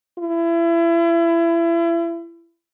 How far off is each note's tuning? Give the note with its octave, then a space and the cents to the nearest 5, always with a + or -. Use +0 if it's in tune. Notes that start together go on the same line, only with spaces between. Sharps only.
E4 +30